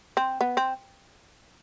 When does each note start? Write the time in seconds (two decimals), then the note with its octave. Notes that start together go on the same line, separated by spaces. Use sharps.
0.17 C4
0.41 B3
0.57 C4